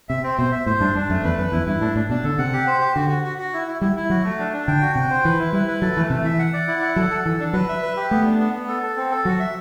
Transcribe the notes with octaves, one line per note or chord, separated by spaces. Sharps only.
C3 E5
C4
B2 C5
E5
A2 C5
G2 D4
G2 D4
F#2 A3
E2 B4
F#2 B4
E2 E4
G2 E4
A2 D4
A2 D4
B2 D4
D3 A4
C3 F#5
G4
C5
G4
D3 F#4
F#4
F#4
F#4
E4
E4
G3 E4
E4
F#3 F#4
A3
D4
D4
D3 G5
F#4
C3 G5
C5
E3 B4
E4
G3 E4
B4
F#3 A4
E3 A3
C3 A3
E3 E5
F#5
D5
E4
F#5
F#3 A4
A4
E3 A4
D4
F#3 B4
E5
B4
G4
A3 B3
D4
B3
B3
A4
A4
C4
A4
F#3 F#4
E5